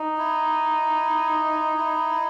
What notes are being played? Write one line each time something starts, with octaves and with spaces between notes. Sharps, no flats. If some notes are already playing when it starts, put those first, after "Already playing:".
Already playing: D#4
E4
E4